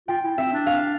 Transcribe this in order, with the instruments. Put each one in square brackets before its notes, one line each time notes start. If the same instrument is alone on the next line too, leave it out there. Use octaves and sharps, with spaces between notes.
[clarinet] F4 [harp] G5
[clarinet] E4
[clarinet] C4 [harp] E5
[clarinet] D4
[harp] F5